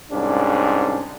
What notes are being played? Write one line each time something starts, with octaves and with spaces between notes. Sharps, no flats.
C2 G#2 C#4 D4